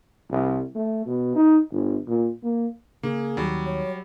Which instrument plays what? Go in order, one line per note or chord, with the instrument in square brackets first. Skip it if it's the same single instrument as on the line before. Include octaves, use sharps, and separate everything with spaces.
[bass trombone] C2
A3
B2
D#4
G1
A#2
A#3
[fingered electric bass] C#3 [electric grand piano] A#3 [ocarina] G#4
[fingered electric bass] D#2 [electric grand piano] F#3 G3
[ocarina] C#5